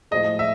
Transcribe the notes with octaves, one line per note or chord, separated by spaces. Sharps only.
A2 F3 G#3 D#5
E5